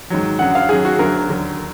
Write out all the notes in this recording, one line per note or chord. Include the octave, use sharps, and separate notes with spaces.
G#2 D#3 F#3
F#2 D3 F#3 F#5
F5
F#2 D#3 F#3 G#4
F#4
D2 D3 F#3 A#4
D#2 D3 F#3